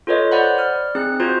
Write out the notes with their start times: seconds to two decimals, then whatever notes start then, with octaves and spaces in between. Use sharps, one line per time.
0.07 F4 A4 B4 C#5 D#5
0.32 C5 D5 F#5 B5
0.58 D5 F6
0.95 C4 D#4 G#4 F#6
1.20 D#4 F4 F#4 C5 G#6